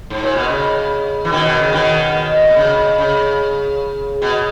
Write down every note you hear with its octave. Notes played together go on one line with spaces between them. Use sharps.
G#2
A#2
B2
C#3
E3
B2 D#3
B2
C#3
B2 D#3
B2
C#3
C#3
B2